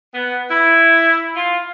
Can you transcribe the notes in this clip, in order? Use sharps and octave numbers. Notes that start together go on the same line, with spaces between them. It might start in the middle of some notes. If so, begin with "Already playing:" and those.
B3
E4
F4